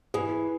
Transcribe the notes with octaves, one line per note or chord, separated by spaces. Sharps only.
E3 G#4